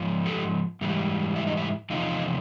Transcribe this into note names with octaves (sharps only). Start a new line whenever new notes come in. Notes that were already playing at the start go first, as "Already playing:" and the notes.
Already playing: G#2 F3
G4 A4
G#2 E3 G3
E4
D#4
E4
E2 C3 F3 D#4 F4